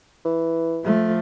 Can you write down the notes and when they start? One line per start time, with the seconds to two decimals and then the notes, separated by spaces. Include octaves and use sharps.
0.25 E3
0.85 F3 A3